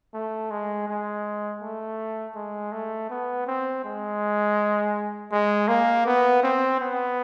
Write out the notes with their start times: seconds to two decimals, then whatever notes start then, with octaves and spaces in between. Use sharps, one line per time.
0.14 A3
0.51 G#3
0.88 G#3
1.62 A3
2.36 G#3
2.72 A3
3.10 B3
3.47 C4
3.84 G#3
5.32 G#3
5.68 A#3
6.06 B3
6.43 C4
6.81 B3